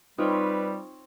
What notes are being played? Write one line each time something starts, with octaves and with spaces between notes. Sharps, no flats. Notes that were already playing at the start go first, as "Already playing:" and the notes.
G3 C4 D#4 F4 B4 C#5 G5